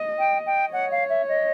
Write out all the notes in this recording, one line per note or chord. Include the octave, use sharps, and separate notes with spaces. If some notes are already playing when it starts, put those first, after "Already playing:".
Already playing: D#5
G5
G5
C#5 F#5
F5
E5
D#5